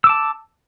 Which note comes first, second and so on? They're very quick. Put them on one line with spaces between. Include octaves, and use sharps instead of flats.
E6 D6 A5